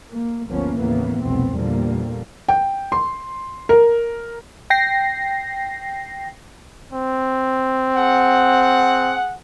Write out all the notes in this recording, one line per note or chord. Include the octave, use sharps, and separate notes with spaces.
A#3
G1 D2 F3 A#3 B3 C#4
D#2 A2 C#3 E3 A#3 B3
F1 C2 B2 B3 C4
E2 A#2 D3 F3 G3 A#3
G5
C6
A#4
G5 A#6 C7
C4
G#4 F#5